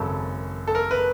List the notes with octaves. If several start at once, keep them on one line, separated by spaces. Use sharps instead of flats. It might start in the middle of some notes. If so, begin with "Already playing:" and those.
Already playing: G#1 F#2 C#3 A4
A4
A#4
B4